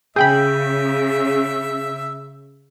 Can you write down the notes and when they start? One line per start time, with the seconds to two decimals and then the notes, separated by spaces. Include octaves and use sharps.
0.16 C#3 G#4 E5 G5 B5 G6